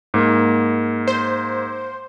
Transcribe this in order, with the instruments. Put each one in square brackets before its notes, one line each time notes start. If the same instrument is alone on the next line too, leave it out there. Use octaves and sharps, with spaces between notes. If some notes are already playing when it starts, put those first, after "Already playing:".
[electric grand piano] G#2 A#3
[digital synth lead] C5